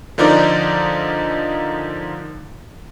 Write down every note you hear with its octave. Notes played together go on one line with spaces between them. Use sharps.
D3 F3 D#4 A#4 C5 D5